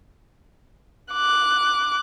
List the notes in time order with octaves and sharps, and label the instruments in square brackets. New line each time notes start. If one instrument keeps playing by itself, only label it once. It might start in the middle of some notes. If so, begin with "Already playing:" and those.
[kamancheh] D6 F#6